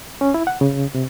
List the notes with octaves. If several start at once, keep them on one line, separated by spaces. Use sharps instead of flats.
C#4
E4
F#5
C#3
C3